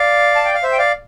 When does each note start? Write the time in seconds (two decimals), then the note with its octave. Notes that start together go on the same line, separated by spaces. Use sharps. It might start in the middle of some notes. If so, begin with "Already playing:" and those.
Already playing: D5 F5
0.35 A5
0.45 G5
0.54 F5
0.63 C5 E5
0.72 G5
0.78 D5 F5